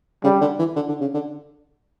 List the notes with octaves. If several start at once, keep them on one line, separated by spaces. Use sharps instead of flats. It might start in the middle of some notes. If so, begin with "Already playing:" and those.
C#3 G3
D3
E3
D3
D3
C#3
D3